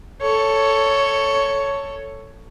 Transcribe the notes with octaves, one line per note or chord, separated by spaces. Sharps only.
A4 C#5